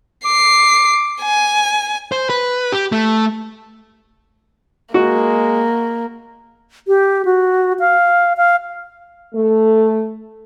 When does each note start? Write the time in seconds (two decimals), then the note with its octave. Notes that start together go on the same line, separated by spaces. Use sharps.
0.25 D6 C7
1.22 G#5
2.12 C5
2.30 B4
2.72 G4
2.92 A3
4.94 G#3 A#3 F#4
6.88 G4
7.25 F#4
7.80 F5
8.37 F5
9.34 A3